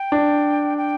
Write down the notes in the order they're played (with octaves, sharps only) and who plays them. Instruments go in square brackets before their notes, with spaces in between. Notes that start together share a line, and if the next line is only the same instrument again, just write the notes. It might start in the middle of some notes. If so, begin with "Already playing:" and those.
Already playing: [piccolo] G5
[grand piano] D4
[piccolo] G5